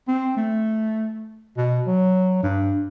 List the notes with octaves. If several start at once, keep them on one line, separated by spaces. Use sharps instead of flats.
C4
A3
B2
F#3
G2